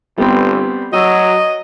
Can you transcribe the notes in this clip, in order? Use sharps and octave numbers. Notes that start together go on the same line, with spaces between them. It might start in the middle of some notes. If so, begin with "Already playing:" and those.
G1 G3 B3 C4
F#3 F#4 D#5 E6